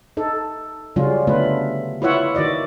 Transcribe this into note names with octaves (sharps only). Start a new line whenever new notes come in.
D#4 A4
C#3 F#3 G3 C#4 F4
D3 A3 B3 F4 B4
E4 F4 B4 C#5 E5 F#5
D#3 F#4 D5 D#5